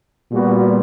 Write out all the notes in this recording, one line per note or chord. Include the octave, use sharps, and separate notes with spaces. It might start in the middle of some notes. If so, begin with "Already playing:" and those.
A#2 G3 B3 F#4